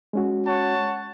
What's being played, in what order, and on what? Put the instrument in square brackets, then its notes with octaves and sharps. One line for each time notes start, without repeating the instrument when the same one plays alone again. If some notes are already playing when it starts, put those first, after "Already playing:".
[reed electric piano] G#3 C#4 F#4
[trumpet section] C#5 F#5 A5